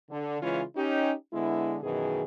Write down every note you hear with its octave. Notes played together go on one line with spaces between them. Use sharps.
D3
C#3 E3 G#3 C#4 E4 F4
C#4 D#4 G4
D3 G#3 B3 E4
F#2 B2 D#3 E3 G#4